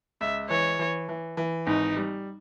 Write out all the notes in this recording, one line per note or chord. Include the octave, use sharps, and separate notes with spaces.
C#2 E5
E3 C#5
E3
E3
E3
G#1 D#4
G3